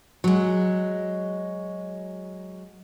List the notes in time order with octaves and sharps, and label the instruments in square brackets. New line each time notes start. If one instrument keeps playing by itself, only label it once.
[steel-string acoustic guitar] F#3 G#3